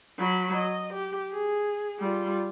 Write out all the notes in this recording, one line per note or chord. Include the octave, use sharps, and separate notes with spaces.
F#3 B5
D#5
G4
G#4
G3 F4